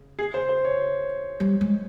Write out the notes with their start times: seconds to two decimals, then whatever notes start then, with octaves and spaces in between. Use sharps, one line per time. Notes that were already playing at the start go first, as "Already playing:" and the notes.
Already playing: C#3
0.19 G#4
0.34 C5
0.49 C5
0.65 C#5
1.40 G3
1.61 G#3